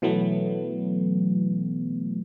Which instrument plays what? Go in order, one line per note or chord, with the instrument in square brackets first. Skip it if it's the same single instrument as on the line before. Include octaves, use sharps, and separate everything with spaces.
[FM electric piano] B2 E3 F#3 A3 B3